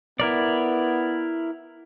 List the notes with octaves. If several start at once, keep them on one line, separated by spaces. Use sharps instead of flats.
B3 E4 A#4 D5